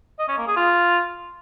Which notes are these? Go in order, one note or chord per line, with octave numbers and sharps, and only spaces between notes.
D#5
C#4
A#3
G#4
F4